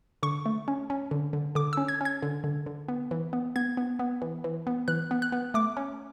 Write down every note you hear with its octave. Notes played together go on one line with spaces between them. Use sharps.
D3 C#6
A3
C#4
C#4
D3
D3
D3 D6
C#4 E6
G#6
C#4 G#6
D3
D3
D3
B3
E3
B3
B3 G#6
B3
B3
E3
E3
B3
E3 F#6
B3
F#6
B3
A3 D6
C#4